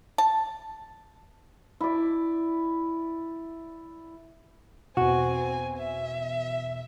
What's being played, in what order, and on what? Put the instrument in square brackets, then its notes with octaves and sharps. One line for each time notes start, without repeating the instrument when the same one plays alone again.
[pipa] A5
[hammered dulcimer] E4 D5
[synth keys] E2 B2 [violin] C4 G#5 [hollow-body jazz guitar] F#4
[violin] E5